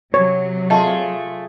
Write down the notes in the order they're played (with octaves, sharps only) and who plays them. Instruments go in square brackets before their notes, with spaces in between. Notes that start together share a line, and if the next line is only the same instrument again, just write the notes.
[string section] C3 F#3 [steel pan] C#5
[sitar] A3 F4 G#4 [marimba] D#5 A5